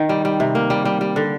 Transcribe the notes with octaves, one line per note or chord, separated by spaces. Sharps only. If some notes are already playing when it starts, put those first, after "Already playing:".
Already playing: D#3
G3
G3
C3
A#3
G3
G3
G3
D3